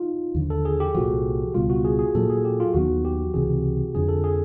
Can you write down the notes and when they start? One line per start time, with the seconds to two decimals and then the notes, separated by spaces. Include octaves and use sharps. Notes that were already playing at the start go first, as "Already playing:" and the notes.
Already playing: D#4 F4
0.35 D#2 D3 F3
0.50 A4
0.65 G#4
0.80 G4
0.94 C2 A#2 F3 F#4
1.54 C#2 B2 G3 F4
1.70 F#4
1.85 G#4
1.99 G#4
2.15 A#2 F#3 A#3 A4
2.30 G#4
2.45 G4
2.60 F4
2.74 D#2 D#3 F#3 B3 F#4
3.05 G4
3.34 C#2 C3 E3 G#4
3.94 F2 D3 F3 G#4
4.08 A4
4.24 G#4